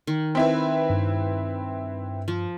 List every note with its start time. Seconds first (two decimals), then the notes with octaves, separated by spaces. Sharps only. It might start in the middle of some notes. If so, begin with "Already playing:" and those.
0.07 D#3
0.35 C4 E4 B4
0.90 G2
2.28 F3